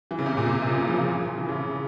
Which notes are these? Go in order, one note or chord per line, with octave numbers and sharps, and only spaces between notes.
E3
C#3
C3
A#2
C3
C3
C#3
E3
F3
F3
E3
C#3